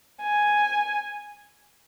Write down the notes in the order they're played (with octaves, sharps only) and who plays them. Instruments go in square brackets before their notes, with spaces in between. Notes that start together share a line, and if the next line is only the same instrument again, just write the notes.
[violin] G#5